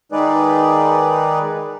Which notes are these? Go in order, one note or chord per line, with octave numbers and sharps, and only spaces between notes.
D#3 G#3 D#4 G#4 B4 D5